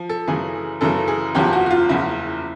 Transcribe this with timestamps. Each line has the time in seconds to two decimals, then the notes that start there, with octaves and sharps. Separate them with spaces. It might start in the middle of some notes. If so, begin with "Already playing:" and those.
Already playing: F3
0.09 A4
0.28 F#2 C#3 E3 A3 G#4
0.81 F#2 C#3 E3 A3 A4
1.08 G#4
1.35 F#1 E2 C#3 F3 G4
1.53 F#4
1.66 F#4
1.71 F4
1.89 F#1 E2 C#3 F3 E4